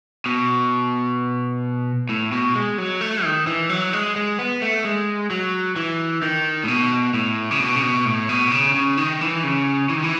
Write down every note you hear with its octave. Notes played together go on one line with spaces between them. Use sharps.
B2
A2
B2
G#3
F#3
A3
D#3
E3
F#3
G#3
G#3
B3
A3
G#3
F#3
E3
D#3
A2
B2
A2
C#3
B2
C#3
B2
A2
B2
C#3
C#3
D#3
E3
C#3
E3
D#3
E3